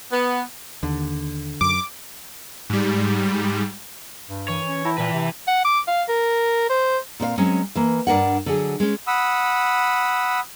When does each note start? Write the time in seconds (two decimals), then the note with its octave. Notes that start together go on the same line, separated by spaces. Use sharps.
0.11 B3
0.83 D#2 D3
1.61 F#2 D6
2.70 G#2 G3
4.29 G2
4.48 E3 C#5 D#7
4.67 C#4
4.85 E4 G5 A5 A#6
4.98 A#2 E3 B4
5.13 C3
5.47 F#5
5.65 D6
5.87 F5
6.08 A#4
6.70 C5
7.20 A#2 C4 C#5 F5
7.38 F#3 G#3 C4 C#4
7.76 E3 A#3
8.07 G2 D4 A#4 F#5
8.46 D3 F#3 G#4
8.80 G#3 C#4
9.07 F#5 B5 D#6 E6